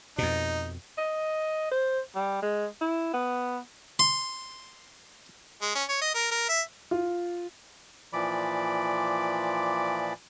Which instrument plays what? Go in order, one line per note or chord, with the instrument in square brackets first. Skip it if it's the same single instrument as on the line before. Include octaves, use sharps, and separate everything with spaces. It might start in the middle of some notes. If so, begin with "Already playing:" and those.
[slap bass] F2 B2 [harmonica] D#4
[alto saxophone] D#5
C5
G3
G#3
E4
B3
[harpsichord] C6
[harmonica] G#3
C#4
C#5
D#5
A#4
A#4
E5
[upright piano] F4
[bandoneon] A#2 E3 F3 D5 B5 D6